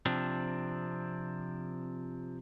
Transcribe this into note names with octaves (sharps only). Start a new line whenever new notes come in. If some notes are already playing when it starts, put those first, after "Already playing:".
C3 F3 C4 D4